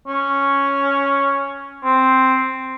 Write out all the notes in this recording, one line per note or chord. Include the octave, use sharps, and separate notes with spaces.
C#4
C4